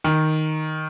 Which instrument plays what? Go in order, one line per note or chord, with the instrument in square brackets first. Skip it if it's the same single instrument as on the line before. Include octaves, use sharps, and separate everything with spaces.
[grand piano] D#3